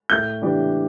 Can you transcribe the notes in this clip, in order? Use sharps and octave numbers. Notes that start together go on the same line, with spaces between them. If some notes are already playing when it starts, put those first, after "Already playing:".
A2 G6
E3 B3 D4 G4